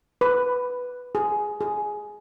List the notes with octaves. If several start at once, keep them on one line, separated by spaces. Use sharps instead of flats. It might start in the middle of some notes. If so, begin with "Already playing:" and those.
B4
G#4
G#4